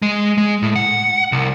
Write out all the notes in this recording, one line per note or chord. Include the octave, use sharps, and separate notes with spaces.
G#3
G#3
A2
F#5
C2